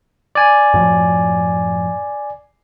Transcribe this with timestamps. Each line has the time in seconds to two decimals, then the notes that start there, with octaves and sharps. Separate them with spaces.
0.35 D5 G#5
0.74 F#2 A2 F3